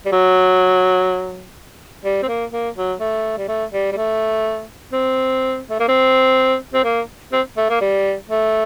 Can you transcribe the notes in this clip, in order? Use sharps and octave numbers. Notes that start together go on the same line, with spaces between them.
G3
F#3
G3
C4
A#3
A#3
F#3
A3
G3
A3
G3
G3
A3
C4
A3
A#3
C4
C4
A#3
C4
A3
A#3
G3
A3